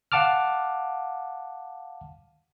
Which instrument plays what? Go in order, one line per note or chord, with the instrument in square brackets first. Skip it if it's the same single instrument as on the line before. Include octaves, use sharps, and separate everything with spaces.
[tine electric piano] F5 F#5 A5 D6 F6